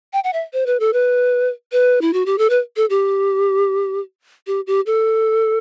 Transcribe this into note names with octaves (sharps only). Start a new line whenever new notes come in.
G5
F#5
E5
C5
B4
A4
B4
B4
E4
F#4
G4
A4
B4
A4
G4
G4
G4
A4